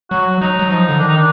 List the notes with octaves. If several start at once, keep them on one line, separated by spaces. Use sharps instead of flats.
F#3 F#4
F#3 D#4
F#3
F3 D#4
D3
D#3 D4
D#4
D4